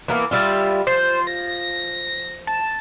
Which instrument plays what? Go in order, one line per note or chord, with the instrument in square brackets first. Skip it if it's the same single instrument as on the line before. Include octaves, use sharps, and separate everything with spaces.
[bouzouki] E3 A#3 B3
G3 E4 F4
[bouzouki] F3 [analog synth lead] C5
[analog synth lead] A#6
A5